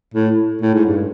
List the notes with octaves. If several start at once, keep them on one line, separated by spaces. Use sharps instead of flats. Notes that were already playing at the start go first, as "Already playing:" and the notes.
A2
A2
G#2
G2